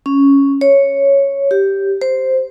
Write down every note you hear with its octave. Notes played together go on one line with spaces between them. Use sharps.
C#4
C#5
G4
C5